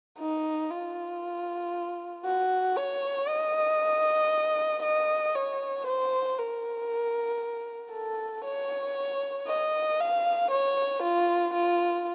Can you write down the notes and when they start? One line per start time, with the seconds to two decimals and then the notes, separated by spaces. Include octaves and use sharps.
0.19 D#4
0.70 F4
2.25 F#4
2.76 C#5
3.29 D#5
4.83 D#5
5.35 C#5
5.87 C5
6.39 A#4
7.92 A4
8.45 C#5
9.47 D#5
10.00 F5
10.51 C#5
11.03 F4
11.54 F4